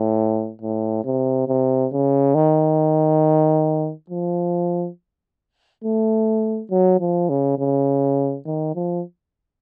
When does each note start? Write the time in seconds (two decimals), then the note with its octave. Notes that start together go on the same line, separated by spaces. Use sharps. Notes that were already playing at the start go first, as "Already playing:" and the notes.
Already playing: A2
0.62 A2
1.05 C3
1.48 C3
1.92 C#3
2.35 D#3
4.10 F3
5.84 A3
6.71 F#3
7.00 F3
7.29 C#3
7.59 C#3
8.46 D#3
8.75 F3